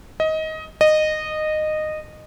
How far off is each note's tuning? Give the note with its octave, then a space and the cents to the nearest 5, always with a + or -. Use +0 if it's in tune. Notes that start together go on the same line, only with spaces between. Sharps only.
D#5 +20
D#5 -15